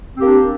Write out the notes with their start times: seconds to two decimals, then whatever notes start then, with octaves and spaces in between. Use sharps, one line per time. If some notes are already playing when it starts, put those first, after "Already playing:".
0.16 C4
0.19 G4
0.22 A#3
0.25 D4